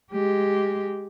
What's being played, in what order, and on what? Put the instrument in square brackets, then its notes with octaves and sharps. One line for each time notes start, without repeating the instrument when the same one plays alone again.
[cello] G#3 G4